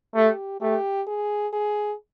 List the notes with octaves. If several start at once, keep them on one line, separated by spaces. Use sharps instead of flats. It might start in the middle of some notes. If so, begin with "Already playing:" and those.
A3 G4
A3 G4
G#4
G#4